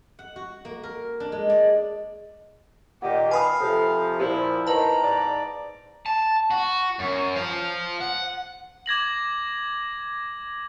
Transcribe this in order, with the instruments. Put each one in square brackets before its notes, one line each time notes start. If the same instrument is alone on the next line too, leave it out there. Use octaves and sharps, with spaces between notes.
[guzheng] F#5
F#4
A#3
A#4
D4
G#3
D5
[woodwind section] A#2 D#3 [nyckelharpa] G4 D#5 [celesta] F#5
[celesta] B4 A5 [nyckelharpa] F5 [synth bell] G#5 B5 D#6
[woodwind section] C3 F3 [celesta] A4
[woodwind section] A#2 F3 [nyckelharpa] E4 [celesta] G4 C5 C6
[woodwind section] E2 D#3 [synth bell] B4 A5 [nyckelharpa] A#5
[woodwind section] G#2 D5
[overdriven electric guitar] A5
F#4
F#2
C5 F5
F#5
[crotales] D6 G#6 A#6 F#7